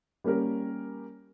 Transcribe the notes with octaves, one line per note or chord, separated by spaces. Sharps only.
G3 A#3 C#4 G4 A#4